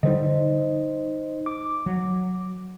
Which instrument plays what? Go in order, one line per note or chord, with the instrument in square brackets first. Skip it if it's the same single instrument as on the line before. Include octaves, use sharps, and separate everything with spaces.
[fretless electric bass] D3 G3 [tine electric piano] D#4 C5 D#5
[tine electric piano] D6
[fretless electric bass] F#3